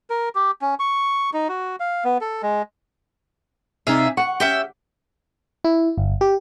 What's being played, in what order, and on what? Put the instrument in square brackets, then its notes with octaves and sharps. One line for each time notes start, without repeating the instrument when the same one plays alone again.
[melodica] A#4
G4
C#4
C#6
D#4
F#4
F5
B3
A4
G#3
[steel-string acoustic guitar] C3 D#4 D5 [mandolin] G#4 E5 F5
[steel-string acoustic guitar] F#5 [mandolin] C#6
[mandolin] C#4 E5 G5 [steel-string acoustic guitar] G4
[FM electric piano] E4
G1
G4